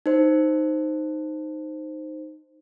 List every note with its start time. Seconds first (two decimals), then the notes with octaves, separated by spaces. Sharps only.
0.06 D#4 C5